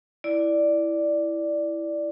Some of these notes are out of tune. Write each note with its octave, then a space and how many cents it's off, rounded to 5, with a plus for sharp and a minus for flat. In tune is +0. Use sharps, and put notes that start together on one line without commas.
E4 +0 D5 +0